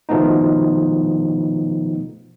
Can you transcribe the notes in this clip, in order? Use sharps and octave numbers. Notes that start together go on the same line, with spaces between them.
B2 D#3 F3 A3 B3 D#4